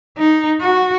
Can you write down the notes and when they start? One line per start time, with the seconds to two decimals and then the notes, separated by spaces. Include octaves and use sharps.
0.18 D#4
0.61 F#4